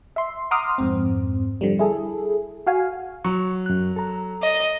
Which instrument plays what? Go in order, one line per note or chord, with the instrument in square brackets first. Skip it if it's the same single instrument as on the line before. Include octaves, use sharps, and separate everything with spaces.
[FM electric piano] E5 C6
F#5 A#5 C6 D6 D#6 F6
F2 G#2 C4
D3 F3 G3
E4 G#4 A4
F#4 F5 G#5
[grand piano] F#3 [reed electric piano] C#6
[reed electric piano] F#2 F#6
A4 A#5
[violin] D#5